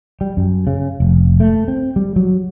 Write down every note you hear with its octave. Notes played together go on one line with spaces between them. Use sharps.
G3
F#2
C#3
F1
A3
C4
G3
F#3